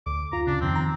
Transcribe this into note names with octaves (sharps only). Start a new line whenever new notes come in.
D2 D6
F#2 F4 A#5
C#3 D4
F2 D#3 C4
A#5